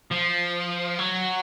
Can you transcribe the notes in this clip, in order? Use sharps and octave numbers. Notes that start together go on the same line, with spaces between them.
F3
F#3